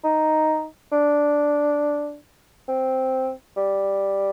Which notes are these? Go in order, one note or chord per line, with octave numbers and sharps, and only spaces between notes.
D#4
D4
C4
G3